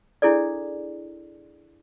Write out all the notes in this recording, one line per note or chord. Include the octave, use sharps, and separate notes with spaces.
D4 E4 G#4 A4 D5